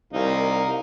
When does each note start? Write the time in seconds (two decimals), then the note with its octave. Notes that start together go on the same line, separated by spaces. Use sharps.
0.13 C2 D#4 A#4 F5